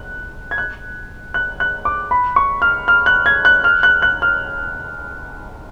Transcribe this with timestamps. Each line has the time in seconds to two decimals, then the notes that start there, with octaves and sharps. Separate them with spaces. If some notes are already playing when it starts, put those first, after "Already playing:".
Already playing: F#6
0.51 G#6
0.58 F#6
1.34 F#6
1.60 F#6
1.85 D6
2.11 B5
2.36 C#6
2.62 F6
2.88 F6
3.06 F#6
3.26 G#6
3.45 F#6
3.64 F6
3.83 F#6
4.02 F#6
4.22 F6